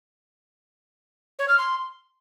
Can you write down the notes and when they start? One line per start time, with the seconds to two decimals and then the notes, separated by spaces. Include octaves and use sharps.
1.38 C#5
1.48 F6
1.57 C6